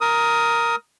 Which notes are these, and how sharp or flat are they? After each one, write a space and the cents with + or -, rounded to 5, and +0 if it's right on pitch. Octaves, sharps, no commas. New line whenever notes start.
A#4 +0 D#6 +15